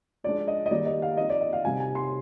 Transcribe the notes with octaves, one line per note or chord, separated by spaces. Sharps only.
F3 G#3 D4 D5
D#5
D#5
D#3 G3 A#3 D#4 D5
D#5
F5
F3 C4 D#4 D#5
D5
D#5
F5
C3 G3 C4 D#4 G#5
G#5
C6